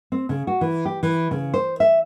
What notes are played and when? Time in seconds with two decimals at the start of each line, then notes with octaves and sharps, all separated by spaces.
0.12 C4
0.29 C#3
0.47 F#4
0.61 E3
0.85 G4
1.03 E3
1.31 C#3
1.54 C5
1.80 E5